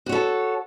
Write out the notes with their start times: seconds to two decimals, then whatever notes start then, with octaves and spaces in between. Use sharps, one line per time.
0.06 F#4
0.09 C#5
0.12 A4
0.15 A5